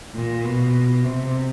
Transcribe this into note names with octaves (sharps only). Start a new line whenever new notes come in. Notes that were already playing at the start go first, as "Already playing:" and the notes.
A#2
B2
C3